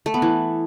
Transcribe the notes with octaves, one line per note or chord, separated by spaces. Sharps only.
A3
B3
E3